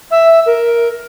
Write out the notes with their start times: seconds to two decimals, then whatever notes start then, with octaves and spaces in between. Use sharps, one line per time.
0.11 E5
0.46 A#4